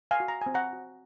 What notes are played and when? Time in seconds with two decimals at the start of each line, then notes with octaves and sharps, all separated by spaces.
0.11 F5 G#5
0.20 F#4
0.28 A#5
0.41 C4 G#5
0.54 F#5 A#5
0.73 F#4